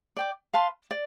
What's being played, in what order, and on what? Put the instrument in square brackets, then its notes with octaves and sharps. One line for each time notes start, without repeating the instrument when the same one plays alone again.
[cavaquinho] D5 G5 D6
B4 F5 A5 C6
D5